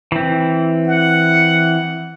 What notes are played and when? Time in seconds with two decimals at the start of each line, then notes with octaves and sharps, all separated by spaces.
0.12 E3 C4
0.88 F#5